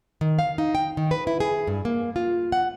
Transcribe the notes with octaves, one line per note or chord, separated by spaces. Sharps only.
D#3
F5
D#4
G5
D#3
B4
E4
G#4
G2
A#3
F4
F#5